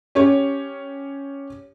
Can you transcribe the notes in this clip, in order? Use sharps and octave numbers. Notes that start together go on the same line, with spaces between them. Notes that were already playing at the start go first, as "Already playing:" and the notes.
C#4 G4 C#5